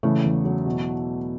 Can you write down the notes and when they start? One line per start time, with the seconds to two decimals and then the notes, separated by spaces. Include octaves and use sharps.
0.03 C#3 E3 A3
0.24 E2
0.45 F#3
0.66 B2